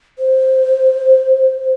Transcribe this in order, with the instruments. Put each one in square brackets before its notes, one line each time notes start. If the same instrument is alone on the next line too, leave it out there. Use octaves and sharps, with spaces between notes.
[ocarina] C5